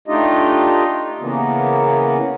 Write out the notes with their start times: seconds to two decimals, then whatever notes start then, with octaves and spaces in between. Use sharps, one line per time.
0.08 A3 D4 D#4 F4 G4 D#5
1.20 C#3 E3 A#3 B3